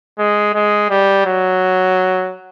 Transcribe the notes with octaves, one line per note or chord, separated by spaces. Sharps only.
G#3
G#3
G3
F#3